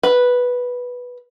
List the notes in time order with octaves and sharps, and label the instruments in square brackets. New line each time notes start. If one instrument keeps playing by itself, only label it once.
[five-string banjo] B4